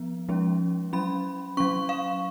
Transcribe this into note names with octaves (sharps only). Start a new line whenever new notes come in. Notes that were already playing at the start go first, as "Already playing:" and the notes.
Already playing: F3 B3
F3 G#3 C#4
F#3 C#4 B5
F#3 C#4 C#6
F5